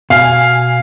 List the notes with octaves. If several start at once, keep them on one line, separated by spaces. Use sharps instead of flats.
B2 F5 G#5